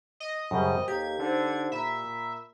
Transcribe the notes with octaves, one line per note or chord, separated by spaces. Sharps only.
D#5
F#2 C#3 G3 A#4 C5 G5
D#2 G4 A4 F5 A#5 G#6
D3 D#4 C5
A#2 E5 A#5 B5